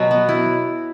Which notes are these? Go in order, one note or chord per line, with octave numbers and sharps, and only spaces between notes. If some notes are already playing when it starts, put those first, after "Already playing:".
Already playing: B2 F#3
B3
E4